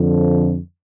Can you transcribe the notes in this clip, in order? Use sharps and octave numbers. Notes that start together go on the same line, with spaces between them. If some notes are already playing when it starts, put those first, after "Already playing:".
Already playing: F2 D3 F3